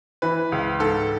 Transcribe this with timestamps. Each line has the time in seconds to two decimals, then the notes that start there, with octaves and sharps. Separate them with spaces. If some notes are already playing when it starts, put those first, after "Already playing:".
0.22 E3 B4
0.52 C#2
0.80 G#2 A4